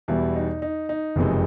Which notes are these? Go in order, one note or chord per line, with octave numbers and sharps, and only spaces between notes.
E2 B2 G3 E4
D#4
D#4
D#4
F#1 F2 C3 E3 G#3